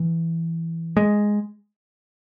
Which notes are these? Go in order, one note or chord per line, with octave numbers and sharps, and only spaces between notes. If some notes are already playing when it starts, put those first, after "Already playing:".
Already playing: E3
G#3